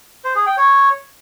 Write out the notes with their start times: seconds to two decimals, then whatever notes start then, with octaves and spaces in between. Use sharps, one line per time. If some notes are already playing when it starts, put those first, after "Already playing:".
0.24 C5
0.35 G#4
0.46 G5
0.57 C#5